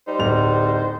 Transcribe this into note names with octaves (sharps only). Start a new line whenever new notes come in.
G3 D#4 C5
D1 F7